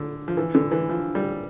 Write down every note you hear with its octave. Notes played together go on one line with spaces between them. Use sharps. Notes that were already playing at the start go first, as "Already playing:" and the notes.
Already playing: D3
F3
E3
D3
E3
F3
G3